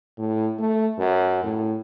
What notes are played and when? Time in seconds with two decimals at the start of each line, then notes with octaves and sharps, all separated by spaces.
0.18 A2
0.59 A3
0.99 F#2
1.43 A2